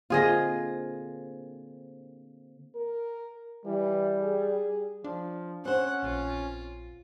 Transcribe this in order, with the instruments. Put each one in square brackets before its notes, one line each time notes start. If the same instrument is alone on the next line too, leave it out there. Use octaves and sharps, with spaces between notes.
[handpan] D3 A#3 C4 [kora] F4 G#4 D#5
[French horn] A#4
[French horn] E3 [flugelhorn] G3
[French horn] G#4
[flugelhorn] F3 [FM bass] D4
[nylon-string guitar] C4 C5 [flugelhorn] C#4 [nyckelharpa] F#5
[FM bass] A#1 [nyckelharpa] F4